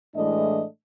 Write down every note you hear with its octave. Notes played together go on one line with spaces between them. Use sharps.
A2 E3 G#3 A3 D4 D#5